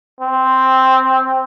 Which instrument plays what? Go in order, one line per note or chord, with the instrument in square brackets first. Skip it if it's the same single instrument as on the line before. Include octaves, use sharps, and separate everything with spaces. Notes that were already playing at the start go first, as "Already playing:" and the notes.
[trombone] C4